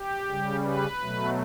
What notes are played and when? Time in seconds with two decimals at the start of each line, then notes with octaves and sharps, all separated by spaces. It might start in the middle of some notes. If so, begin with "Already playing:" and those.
Already playing: G4
0.28 C#3 G3
0.63 B4
1.00 B2 F#3 A3